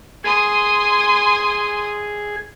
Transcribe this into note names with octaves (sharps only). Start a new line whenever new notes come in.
G#4 G#5 C6 D#6